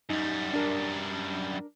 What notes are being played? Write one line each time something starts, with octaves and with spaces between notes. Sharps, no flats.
F#2 G3 D#4
D4 A#4